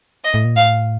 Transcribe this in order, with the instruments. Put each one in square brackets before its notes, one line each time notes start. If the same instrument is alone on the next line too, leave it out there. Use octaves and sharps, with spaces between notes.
[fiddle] D#5
[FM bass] A2
A#2
[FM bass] A2 [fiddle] F5